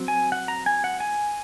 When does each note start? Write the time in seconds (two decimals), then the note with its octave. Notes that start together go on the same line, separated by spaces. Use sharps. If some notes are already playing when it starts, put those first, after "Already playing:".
Already playing: F#3 C4
0.08 G#5
0.32 F#5
0.48 A#5
0.66 G#5
0.84 F#5
1.00 G#5